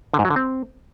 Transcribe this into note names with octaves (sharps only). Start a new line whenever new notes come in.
D3
G#2
F#3
D3
C4